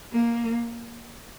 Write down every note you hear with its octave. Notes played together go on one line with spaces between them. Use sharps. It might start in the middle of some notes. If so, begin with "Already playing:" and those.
A#3